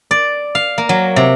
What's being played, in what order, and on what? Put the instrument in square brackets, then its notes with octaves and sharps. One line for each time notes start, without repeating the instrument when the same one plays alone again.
[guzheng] D5
F5
A#3
F#3
C3